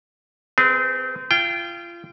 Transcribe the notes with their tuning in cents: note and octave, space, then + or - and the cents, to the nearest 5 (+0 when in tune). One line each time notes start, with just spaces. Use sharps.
C4 -30 G#4 +0 B4 +0
F4 -30 G5 +0